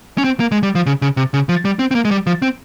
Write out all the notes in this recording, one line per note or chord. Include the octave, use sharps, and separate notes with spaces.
C#4
C4
A#3
G#3
G3
F3
C#3
C#3
C3
C#3
F3
G3
C4
C4
A#3
G#3
G3
F3
C4